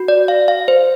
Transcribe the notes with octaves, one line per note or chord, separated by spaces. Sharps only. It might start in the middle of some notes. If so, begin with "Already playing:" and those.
Already playing: F#4
D5
F5
F5
C5